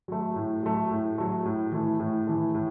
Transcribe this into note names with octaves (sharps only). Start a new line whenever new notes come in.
F#3 A3
A2
F#3 A3
A2
F#3 A3
A2
E3 A3
A2
E3 A3
A2